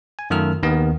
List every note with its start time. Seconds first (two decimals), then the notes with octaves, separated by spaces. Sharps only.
0.19 G#5
0.30 F#2 D#3 A3 F4 A4 F6
0.63 D#2 D#3 B3